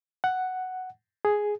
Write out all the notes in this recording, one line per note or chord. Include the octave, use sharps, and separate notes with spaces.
F#5
G#4